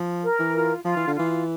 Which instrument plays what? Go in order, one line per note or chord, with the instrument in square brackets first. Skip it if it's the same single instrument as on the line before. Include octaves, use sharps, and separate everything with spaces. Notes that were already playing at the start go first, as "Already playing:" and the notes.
Already playing: [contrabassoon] F3
[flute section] A#4
[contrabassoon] E3
[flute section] F4
[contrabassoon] F3 [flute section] F4
[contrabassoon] E3
D3
[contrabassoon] E3 [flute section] F4